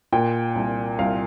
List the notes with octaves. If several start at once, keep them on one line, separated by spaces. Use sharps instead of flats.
A#2 G5
C2
C2 F5